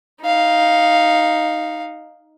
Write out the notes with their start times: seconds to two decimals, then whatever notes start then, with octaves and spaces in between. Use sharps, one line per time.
0.23 D#4 F5